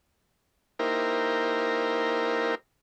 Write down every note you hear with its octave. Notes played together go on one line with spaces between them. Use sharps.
A#3 D#4 E4 G4 A#4 C5